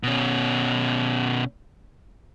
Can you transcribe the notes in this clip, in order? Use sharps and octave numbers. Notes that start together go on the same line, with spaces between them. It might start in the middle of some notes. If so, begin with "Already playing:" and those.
B2 C#4